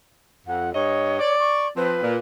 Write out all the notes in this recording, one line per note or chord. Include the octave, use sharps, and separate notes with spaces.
F2 F#5
G2 C#5 D#5
D5
C#6
F3 C4 B4
A#2